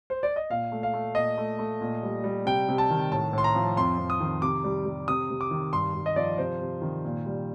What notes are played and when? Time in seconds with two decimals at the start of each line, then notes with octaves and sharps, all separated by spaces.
0.10 C5
0.23 D5
0.36 D#5
0.50 A#2 F5
0.72 A3
0.83 F5
0.93 A3
1.15 A#2 D#5
1.38 A3
1.59 A3
1.81 A#2
2.03 G3
2.24 G3
2.46 C3 G5
2.69 C3
2.78 A5
2.90 D#3
3.12 A2 A5
3.33 A2 C6
3.44 A#5
3.55 F3
3.77 F2 C6
3.98 F2
4.10 D#6
4.21 D#3
4.42 C3 D6
4.64 G3
4.85 G3
5.08 C3 D#6
5.30 C3
5.41 D6
5.51 D#3
5.73 G2 C6
5.94 G2
6.06 D#5
6.16 F3 D5
6.38 C3 C5
6.61 C3
6.82 D#3
7.05 A#2
7.26 G3